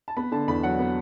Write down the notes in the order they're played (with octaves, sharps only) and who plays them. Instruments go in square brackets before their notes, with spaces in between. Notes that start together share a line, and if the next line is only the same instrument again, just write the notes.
[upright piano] A5
B3 B5
D3 A5
E2 B5
F#3 F#5
B3